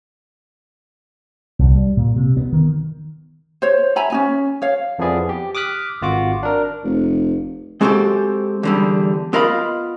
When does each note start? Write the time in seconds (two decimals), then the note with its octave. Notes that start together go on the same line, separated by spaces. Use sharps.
1.59 C2
1.75 G3
1.97 A#2
2.16 C3
2.37 B3
2.53 D#3
3.62 C5 C#5
3.96 E5 G#5 A#5 B5
4.10 C#4 D#4 G#5
4.62 C#5 F5
4.99 F2 F3 B3 E4 G#4 D5
5.29 G4
5.55 D6 D#6 F6 F#6 B6
6.02 G#1 F4 F#4 D6
6.43 D4 A#4
6.83 F1
7.81 G#3 C4 F#4 G4 A4 C5
8.63 E2 D3 G3
9.33 B3 F4 A#4 D#5 F5 B5